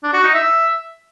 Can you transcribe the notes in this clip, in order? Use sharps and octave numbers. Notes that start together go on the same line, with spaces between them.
D4
F#4
D#4
E5